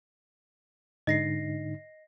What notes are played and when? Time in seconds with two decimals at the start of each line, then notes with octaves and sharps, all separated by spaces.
1.07 G#2 D3 D#4 D#5 A#6 C7